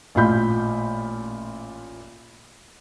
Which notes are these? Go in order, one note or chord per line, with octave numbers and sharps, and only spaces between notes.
A1 A#2 F4 B5 G6